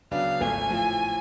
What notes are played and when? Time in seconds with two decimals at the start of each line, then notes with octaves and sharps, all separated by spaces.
0.11 C#3 F#3 B3 D4 F5
0.41 G#1 G#2 F3 A3 F4 G#5
0.71 A2 F3